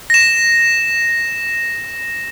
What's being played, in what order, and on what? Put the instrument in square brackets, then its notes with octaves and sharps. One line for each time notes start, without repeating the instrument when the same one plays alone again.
[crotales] A#6 E7